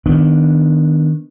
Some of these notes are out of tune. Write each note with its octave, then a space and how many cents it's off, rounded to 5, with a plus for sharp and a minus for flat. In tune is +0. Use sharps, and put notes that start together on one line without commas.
D#3 +0 B3 +0 D4 +0